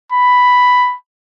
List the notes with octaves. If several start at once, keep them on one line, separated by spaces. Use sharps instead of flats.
B5